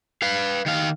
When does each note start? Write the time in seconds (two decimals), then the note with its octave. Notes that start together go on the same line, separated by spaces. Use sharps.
0.22 B4 F5
0.66 D#3 F5